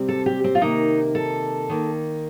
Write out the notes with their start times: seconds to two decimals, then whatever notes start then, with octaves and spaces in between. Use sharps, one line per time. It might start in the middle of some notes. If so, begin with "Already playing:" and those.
Already playing: C3 G3 C4
0.09 A4
0.26 G4
0.44 C4
0.55 F4
0.61 C3 D#3 A#3 D#4
1.15 A4
1.69 D#3 A#3